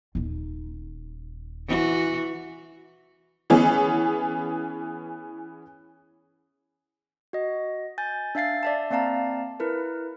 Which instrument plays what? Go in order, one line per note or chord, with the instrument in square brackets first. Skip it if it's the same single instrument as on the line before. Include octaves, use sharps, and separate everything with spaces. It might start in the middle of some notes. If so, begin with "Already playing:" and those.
[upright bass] D#1 D#4
[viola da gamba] E3 F#4
[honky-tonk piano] E3 B3 C#4 G#4
[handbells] F#4 D#5
G#5 G6 A6
D4 E5 F5 A6 C7
D5 E5 A5
A#3 C4 D5 F5 A5 A#5
E4 A#4 B4